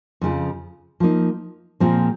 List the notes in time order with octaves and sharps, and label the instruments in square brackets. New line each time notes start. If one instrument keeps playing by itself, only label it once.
[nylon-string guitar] F2 C#3 F3
F3 A#3 D#4
A#2 F3 G#3 C4